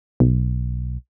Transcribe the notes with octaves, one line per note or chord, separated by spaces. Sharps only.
B1